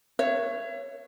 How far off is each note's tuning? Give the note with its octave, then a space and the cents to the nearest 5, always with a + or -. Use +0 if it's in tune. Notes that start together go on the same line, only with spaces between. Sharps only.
C#5 +0 E5 +40